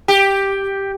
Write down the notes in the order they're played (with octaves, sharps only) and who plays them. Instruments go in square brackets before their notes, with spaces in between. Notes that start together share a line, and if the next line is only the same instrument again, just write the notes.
[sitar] G4